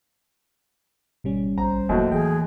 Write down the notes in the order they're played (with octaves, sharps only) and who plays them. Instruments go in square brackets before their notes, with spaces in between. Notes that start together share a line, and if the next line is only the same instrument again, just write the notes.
[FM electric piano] G#1 G3 C#4 [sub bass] B2
[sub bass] A#1 [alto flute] C5 [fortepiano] A#5
[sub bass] F1 [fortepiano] D#2 A2 F#3
[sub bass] E3 [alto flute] G#4 [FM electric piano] G5